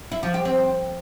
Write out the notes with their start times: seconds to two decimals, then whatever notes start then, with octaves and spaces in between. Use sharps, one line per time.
0.12 E4
0.23 F3
0.34 G4
0.45 C4